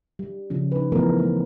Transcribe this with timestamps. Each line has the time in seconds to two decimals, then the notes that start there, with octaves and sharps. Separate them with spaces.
0.19 G3
0.50 C#3 F3 C#4
0.72 D#4 B4
0.92 E3 F3 A3 B3 A#4
1.19 A3